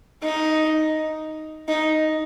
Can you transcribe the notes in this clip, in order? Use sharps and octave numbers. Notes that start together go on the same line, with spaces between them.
D#4
D#4